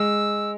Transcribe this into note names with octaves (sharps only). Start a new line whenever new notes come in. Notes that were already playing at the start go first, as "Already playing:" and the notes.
Already playing: G#3 E6